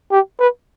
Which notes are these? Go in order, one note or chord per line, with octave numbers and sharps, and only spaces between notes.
G4
B4